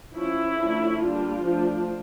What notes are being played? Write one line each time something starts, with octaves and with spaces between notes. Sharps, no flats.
F3 C#4 E4
D3 F3 A3 C#4
G3 A#3 D4 F4
F3 A3 D4